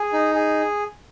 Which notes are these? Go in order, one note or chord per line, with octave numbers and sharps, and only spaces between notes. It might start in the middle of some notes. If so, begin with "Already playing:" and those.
Already playing: G#4
D#4
G#4